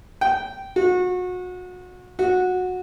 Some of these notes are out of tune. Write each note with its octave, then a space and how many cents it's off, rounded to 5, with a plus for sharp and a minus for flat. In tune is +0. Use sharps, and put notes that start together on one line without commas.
G5 -10
F#4 -30
F#4 -15